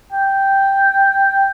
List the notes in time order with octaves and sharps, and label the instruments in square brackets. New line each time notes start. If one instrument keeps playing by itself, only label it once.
[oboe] G5